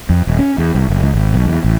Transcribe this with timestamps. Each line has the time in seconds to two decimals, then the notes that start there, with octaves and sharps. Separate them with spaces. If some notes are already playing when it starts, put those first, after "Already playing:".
0.09 F2
0.27 D#1
0.39 C#4
0.58 E2
0.75 C2
0.88 F#1
1.02 C#2
1.14 G#1
1.34 B1
1.46 E2
1.64 A1